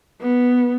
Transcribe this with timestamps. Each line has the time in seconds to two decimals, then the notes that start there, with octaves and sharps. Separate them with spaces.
0.21 B3